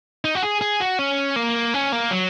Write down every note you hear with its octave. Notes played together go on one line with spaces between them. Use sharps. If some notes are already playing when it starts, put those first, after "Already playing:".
D#4
F#4
G#4
G#4
F#4
C#4
A#3
C#4
A#3
F#3